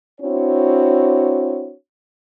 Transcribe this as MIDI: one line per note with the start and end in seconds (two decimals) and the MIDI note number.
0.21 1.73 60
0.21 1.73 62
0.21 1.73 64
0.21 1.73 66
0.21 1.73 73